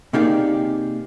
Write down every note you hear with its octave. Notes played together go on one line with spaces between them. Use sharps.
C3 A#3 D#4 G4 G#4 D5